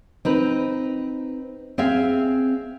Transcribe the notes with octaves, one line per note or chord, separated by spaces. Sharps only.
C4 D#4 B4
C4 G#4 E5 F5